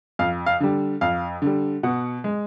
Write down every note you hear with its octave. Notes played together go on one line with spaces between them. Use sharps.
F2 F5
F5
D3 G3
F2 F5
D3 G3
B2 F#5
G#3